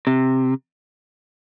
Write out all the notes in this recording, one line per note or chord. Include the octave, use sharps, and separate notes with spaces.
C3